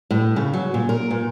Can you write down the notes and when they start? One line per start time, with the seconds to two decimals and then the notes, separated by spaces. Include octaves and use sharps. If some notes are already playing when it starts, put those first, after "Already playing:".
0.11 A2
0.36 C#3
0.53 F#3
0.74 A#2
0.89 A#4
1.11 A#2